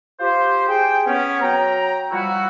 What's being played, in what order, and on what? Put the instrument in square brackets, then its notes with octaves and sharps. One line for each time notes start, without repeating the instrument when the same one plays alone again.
[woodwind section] F4 G4 C5
G#4 G5
B3 C#4
F#3 G5 A#5
F3 G3 E4 F#4